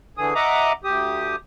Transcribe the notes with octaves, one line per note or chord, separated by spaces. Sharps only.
D3 E3 G#4 D#6
D#5 E5 F#5 A#5 D6 D#6
D2 G4 D#6